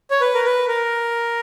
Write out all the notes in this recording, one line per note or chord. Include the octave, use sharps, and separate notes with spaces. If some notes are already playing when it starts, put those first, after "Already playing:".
C#5
B4
A#4
B4
A#4